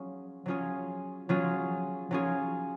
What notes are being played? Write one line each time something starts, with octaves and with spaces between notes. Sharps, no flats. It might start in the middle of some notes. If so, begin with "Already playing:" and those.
Already playing: F#3 C#4 F4 G#4
F#3 C#4 F4 G#4
F#3 C#4 F4 G#4
F#3 C#4 F4 G#4